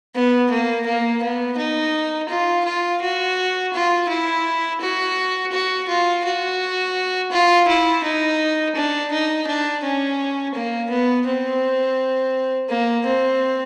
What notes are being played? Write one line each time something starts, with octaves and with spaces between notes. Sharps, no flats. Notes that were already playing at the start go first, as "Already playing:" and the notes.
B3
A#3
A#3
B3
D#4
F4
F4
F#4
F4
E4
F#4
F#4
F4
F#4
F4
E4
D#4
D4
D#4
D4
C#4
A#3
B3
C4
A#3
C4